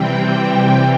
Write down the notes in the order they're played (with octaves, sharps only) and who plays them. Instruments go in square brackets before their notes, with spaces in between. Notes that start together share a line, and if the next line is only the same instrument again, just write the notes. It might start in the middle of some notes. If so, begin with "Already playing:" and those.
Already playing: [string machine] C3 E3 G3 C4 G5